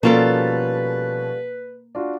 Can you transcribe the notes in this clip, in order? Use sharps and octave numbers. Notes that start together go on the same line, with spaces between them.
B2 F3 G3 A#3 C#4 F4 A4 B4
D4 F4 F#4